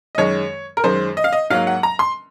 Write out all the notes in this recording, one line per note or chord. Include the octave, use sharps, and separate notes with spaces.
D#5
F#2 D#3 G#3 C#5
A#4
F#2 D#3 G#3 C5
D#5
F5
D#5
G#2 F#3 A#3 F5
F#5
A#5
C6